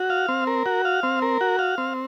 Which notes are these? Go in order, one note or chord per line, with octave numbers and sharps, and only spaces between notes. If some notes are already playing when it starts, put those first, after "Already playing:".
Already playing: F#4
F5
C4
A#4
F#4
F5
C4
A#4
F#4
F5
C4